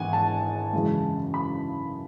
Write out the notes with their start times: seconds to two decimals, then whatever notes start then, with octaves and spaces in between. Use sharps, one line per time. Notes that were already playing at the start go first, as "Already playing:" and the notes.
Already playing: G#1 G#2 E3 B3 D4 F#5 G#5
0.13 A5
0.73 F#2 C#3 E3 G#3
1.34 B5